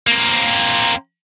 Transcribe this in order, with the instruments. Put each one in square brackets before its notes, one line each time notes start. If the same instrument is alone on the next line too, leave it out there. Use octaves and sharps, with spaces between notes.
[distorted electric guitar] A#3 C4